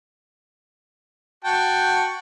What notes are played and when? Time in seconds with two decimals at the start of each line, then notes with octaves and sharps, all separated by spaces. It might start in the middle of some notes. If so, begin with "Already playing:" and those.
1.44 F#4 G5 A5